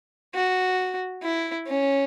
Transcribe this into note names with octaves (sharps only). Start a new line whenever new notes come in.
F#4
E4
C#4